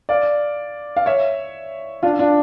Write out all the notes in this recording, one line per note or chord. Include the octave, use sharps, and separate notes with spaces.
D5 F5
F5
C#5 E5
D4 F4
D4 F4